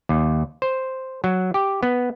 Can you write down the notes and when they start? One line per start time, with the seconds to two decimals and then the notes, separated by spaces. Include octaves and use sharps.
0.09 D#2
0.62 C5
1.24 F#3
1.54 G4
1.83 B3